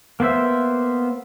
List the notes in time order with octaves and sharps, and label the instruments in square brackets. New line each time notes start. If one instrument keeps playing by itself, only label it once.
[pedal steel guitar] A#3 B3 C5 E5